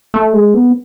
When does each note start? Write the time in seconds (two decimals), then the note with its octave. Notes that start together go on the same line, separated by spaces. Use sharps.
0.14 A3
0.33 G#3
0.54 B3